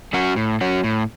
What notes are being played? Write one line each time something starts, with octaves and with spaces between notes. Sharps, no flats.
F#3 C#4 F#4
A2
F#3 C#4 F#4
A2